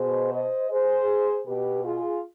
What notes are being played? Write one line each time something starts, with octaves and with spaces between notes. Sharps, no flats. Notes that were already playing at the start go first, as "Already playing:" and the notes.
Already playing: B2 G#4 C5
C5 D#5
G#4 C5
B2 G4 B4
F4 G#4